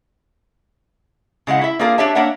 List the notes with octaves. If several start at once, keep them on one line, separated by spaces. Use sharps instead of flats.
C#3 G#3 E4 F#5
E4 E5
A#3 D4 F4 G#4 A#4 F5
D4 G4 C#5 E5 A5
A#3 D4 C#5 E5 F#5